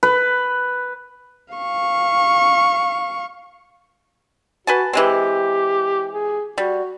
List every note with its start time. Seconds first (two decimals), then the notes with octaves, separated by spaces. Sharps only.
0.03 B4
1.54 F5 C#6
4.67 F#4 B4 G#5 A5
4.93 E3 G#3 C4 G4
6.13 G#4
6.58 G3 F#4